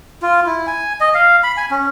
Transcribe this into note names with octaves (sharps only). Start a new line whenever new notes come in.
F4
E4
G#5
D#5
F5
B5
G#5
C#4